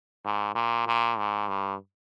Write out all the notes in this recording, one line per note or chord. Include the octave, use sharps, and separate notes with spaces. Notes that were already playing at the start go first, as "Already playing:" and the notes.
G#2
A#2
A#2
G#2
G2